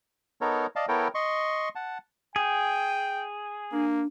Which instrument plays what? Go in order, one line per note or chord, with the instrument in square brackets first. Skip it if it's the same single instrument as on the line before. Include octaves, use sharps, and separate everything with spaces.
[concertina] B3 D#4 A4 A#4 C#5
D5 D#5 F5 A5
B3 E4 A4 A#4 C#5 G5
D#5 C6 C#6
F#5 A5
[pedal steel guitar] G#4 [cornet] G5
[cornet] A#3 [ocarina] D4